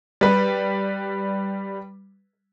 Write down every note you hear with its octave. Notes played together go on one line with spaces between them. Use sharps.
G3 B4